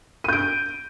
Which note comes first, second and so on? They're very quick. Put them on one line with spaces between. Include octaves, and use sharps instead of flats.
D#7 G6 D7